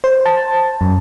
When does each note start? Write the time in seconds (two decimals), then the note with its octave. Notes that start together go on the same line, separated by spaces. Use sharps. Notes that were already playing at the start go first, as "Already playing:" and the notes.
0.04 C5
0.26 A5
0.81 F#2